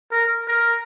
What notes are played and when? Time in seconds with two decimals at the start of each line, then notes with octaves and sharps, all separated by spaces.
0.11 A#4
0.47 A#4